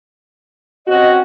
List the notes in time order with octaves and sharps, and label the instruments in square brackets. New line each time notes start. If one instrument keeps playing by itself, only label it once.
[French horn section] C4 C#4 F#4 [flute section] D#5